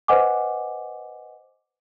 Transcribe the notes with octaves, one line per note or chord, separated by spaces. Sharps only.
B4 C5 D#5 F#5 G#5 D6